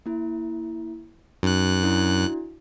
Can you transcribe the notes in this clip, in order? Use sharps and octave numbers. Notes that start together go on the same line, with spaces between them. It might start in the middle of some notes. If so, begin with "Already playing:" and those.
A#3 E4
F#2 D#4 F#6
D4 E4 F#4